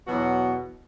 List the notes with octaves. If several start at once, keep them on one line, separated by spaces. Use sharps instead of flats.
E2 B2 F#3 B3 F#4